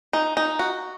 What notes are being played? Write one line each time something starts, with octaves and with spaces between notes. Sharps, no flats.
D#4
D#4
F#4